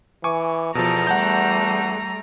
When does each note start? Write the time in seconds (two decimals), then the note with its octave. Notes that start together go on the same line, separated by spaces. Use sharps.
0.24 E3 G#5 C#6 D6
0.75 E2 B2 F3 G4 A4 A#5
1.07 G3 A3 F#5 A5 G6